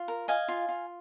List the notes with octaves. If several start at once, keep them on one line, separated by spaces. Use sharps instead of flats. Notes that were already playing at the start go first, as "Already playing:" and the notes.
Already playing: F4
A#4
D#5 F5 G#5
F4
F4